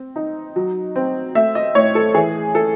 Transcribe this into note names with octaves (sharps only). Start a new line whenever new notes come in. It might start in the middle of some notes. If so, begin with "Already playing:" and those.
Already playing: C4
D#4
F#3
C4
A3 E5
D#5
A2 C#5
A4
E3 G#4
A4